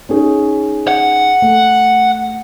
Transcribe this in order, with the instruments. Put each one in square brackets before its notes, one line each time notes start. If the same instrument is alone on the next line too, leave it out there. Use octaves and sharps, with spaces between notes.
[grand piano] C#4 D#4 G#4
[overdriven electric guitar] F#5
[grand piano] A3